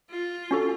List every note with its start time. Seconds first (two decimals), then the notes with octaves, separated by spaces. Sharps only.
0.10 F4
0.51 C#4 F#4 A4